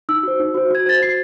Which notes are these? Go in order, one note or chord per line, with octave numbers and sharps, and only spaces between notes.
D#4 E6
F#4 C5
D#4
F#4 C5
F#4 G#6
C5 A6
F#4 C7